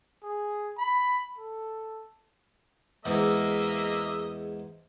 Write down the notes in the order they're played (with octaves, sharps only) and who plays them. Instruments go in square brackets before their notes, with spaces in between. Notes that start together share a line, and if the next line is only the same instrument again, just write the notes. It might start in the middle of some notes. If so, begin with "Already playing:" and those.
[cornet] G#4
B5
A4
[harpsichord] E2 G#2 [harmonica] A#3 D#5 E5